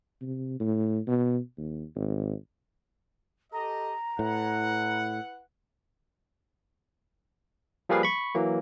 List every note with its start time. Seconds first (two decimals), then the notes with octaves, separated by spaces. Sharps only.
0.21 C3
0.60 A2
1.07 B2
1.57 D#2
1.96 G#1
3.53 G4 A4 D#5 A#5
4.19 A2 E4 B4 F#5
7.89 F3 G3 A#3 G#4 B4 F5
8.03 B5 C#6
8.35 E3 F#3 A#3